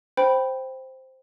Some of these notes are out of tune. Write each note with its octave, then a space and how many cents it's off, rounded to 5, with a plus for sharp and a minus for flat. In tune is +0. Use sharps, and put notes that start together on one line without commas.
C5 +0 G5 +0 B5 +0